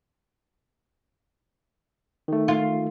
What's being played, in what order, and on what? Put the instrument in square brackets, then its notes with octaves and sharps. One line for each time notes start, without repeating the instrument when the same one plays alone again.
[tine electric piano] D#3 A3
[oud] F4